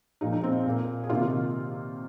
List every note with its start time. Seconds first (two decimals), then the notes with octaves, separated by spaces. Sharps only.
0.21 A#2 F3 G#3 D#4
0.33 D#4
0.43 C4
0.66 A#2 A#3
1.04 G#4
1.09 C3 D#3 A#3 F4
1.22 F4